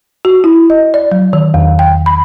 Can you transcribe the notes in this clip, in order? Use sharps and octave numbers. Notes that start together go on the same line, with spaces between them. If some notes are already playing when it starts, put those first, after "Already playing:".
F#4
E4
D#5
D5
F#3
D#3
E2
G5
B5